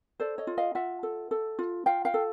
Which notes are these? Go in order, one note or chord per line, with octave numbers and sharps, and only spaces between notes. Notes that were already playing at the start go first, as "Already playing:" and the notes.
A4 C5 D5
C#5 D#5
F4
D#5 F5
F4 E5 F#5
A4
A4
F4
F4 F5 G5
F5 G5
A4